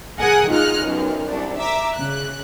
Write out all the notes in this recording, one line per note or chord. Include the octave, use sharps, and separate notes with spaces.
G#4 A#4 F#5 G#5 D#6 F#6
G#2 D#3 D#4 F4 F6 F#6
B1 F#2
C2 D4
E5 A#5 D6
C#3 F#6